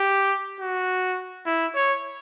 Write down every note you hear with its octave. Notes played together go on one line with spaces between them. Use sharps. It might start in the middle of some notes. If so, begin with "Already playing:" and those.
Already playing: G4
F#4
E4
C#5